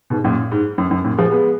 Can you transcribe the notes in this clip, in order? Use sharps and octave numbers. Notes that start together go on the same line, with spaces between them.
G#2 B2
F#2 A#2
G#2
F#2
F#2
F#2 A#2
F3 G#3
G#3 B3